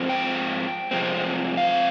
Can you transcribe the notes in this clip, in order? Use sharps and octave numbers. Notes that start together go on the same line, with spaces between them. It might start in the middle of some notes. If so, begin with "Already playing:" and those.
Already playing: G#2 F3 G#3 C4
G5
C3 F3 G#3 C4
F5